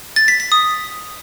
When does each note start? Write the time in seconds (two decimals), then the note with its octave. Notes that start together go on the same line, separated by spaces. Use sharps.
0.16 A6
0.28 B6
0.40 B6
0.52 D#6